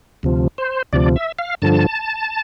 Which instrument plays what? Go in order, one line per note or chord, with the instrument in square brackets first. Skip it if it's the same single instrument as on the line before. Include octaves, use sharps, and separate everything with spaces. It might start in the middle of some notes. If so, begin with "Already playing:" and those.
[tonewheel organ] D2 C3 F3
C5
D2 C3 F3 D5
E5
F5
G2 D3 F3 A5